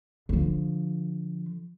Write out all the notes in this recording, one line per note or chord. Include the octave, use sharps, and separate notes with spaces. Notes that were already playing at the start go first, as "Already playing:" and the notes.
D3 F3